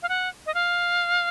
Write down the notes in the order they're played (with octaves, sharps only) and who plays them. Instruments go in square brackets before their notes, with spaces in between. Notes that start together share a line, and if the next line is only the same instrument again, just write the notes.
[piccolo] F5
F#5
D#5
F5